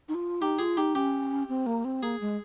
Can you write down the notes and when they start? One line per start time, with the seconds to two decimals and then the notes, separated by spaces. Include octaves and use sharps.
0.08 D#4
0.14 F4
0.41 D#4 G4
0.59 F4 G#4
0.77 D#4 G4
0.95 C#4 G4
1.49 C4
1.66 A#3
1.85 C4
2.03 A#3 G#4
2.21 G#3